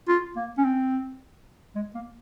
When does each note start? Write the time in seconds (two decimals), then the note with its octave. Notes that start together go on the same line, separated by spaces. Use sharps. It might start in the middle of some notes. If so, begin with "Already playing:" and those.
0.08 F4
0.36 A#3
0.58 C#4
0.64 C4
1.75 G#3
1.95 A#3